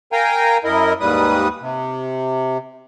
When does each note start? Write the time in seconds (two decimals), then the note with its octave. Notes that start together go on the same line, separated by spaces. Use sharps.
0.12 A#4 F5 G5 G#5 A#5
0.64 F#2 E4 A#4 D#5
1.00 D#2 G#2 G3 B4 D#6
1.61 C3